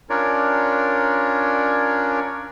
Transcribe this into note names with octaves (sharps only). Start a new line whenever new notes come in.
C#4 D4 F4 A#4 C#5 D5